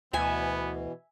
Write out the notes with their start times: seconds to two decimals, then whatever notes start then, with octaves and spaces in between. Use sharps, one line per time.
0.13 D2 B2 E3 B3 E5 G#5